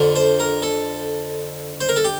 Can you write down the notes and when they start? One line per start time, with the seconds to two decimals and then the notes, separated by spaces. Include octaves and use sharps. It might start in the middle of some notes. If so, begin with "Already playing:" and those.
Already playing: F2 D3
0.16 C5
0.40 A#4
0.62 A4
1.81 C5
1.89 A#4
1.96 A4
2.04 G4